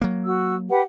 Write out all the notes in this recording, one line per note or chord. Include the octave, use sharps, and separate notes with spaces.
F#3 A#3
F#4 E6
G4 B4 F#5